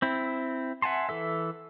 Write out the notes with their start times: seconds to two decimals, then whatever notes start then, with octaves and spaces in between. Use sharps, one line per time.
0.02 C4 E4
0.82 E5 F#5 G#5 A5 C6
1.09 E3 A4 E5